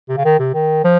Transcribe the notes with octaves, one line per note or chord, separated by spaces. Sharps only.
C3
C#3
D#3
C3
D#3
F3